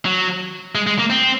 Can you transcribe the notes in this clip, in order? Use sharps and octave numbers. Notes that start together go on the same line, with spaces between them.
F#3
G#3
G#3
A#3
C4